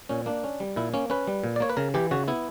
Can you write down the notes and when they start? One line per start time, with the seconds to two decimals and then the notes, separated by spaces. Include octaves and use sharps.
0.09 A#2 C#4
0.26 A#3 D4
0.44 C#4
0.60 G3
0.76 A#2 E4
0.94 A#3 C#4
1.10 C#4 B4
1.27 G3
1.44 A#2
1.56 D5
1.60 A#3 C#5
1.69 B4
1.77 C#3 A#4
1.94 E3 G4
2.11 C#3 F#4
2.28 B3 E4